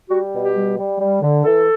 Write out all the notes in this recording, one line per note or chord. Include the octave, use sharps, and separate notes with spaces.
G3 F#4
B2
G4
G3
G3
G3
D3
E3 A4